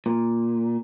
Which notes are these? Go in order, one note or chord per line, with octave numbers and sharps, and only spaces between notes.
A#2